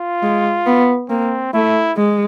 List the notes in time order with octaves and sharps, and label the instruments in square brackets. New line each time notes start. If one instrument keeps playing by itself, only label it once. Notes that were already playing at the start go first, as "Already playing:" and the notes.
Already playing: [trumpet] F4
[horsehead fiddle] G#3
B3
[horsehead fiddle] A#3 [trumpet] C4
[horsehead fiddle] A3 [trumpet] E4
[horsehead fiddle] G#3